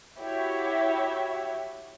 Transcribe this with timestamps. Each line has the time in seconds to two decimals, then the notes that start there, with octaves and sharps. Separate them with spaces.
0.18 E4 F#4 G4 C#5 E5